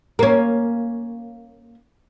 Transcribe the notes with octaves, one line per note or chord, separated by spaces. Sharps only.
A#3 C#4